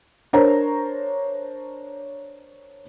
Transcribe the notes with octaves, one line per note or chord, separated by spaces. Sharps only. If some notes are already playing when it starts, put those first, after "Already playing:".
D4 A#4 C5 C#5 A#5